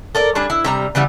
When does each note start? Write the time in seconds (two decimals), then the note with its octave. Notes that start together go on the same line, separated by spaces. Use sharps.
0.15 A4 A#4 D5
0.35 G3 D4 G#4
0.50 E4
0.64 C3 G3 A#5
0.95 C#3 E3 G3 B3